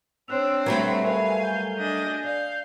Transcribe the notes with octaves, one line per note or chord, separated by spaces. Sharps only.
C4 D4 C#5 E6 F#6 F7
F#3 G3 A3 B4
A#4 E5 F5 G#5
G6
D4 D#5 G#5
D5 F5